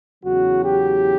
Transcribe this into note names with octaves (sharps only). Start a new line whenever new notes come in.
E2 C#3 F#3 F#4
G4